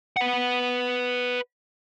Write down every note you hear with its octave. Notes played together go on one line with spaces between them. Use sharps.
B4 F#5